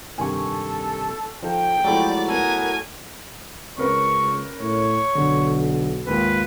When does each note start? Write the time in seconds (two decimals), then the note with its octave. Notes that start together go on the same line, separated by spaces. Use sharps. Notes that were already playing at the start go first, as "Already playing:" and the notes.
0.18 G2 C3 D#3 A4 G#5 C#6
1.43 F3 D#4 A4 G5
1.84 F3 F#3 G#3 A3 E4 D5
2.28 B3 A4 A#4 G#5
3.78 C#2 C#4 A#4 B4 C#6
4.60 A2 C#5
5.15 B1 D3
6.07 D#2 G#2 F4 B4